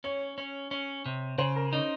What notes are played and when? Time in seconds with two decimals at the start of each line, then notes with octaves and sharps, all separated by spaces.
0.04 C#4 C#5
0.38 C#4
0.71 C#4
1.06 C3
1.38 C#3 C5
1.56 A#4
1.73 C#4 D#4